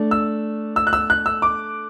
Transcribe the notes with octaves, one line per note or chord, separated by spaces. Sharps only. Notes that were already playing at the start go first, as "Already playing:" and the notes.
Already playing: A3 D4
E6
E6
F#6
E6
F#6
E6
D6